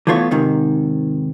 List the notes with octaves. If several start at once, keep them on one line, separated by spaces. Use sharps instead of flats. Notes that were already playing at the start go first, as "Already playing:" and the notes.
E3 A3 B3 F4 C#5
G#2 C3 D#3